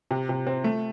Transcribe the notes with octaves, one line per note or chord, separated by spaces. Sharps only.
C3
C3
C4
A3